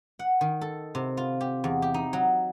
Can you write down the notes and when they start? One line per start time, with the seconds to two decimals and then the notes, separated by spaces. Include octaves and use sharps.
0.19 F#5
0.41 D#3
0.61 A4
0.95 C3
1.17 F4
1.41 G4
1.64 E2
1.82 G4
1.94 D#4
2.13 F#3